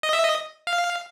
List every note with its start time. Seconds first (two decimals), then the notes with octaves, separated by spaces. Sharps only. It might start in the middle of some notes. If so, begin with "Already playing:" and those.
0.03 D#5
0.13 E5
0.23 D#5
0.67 F5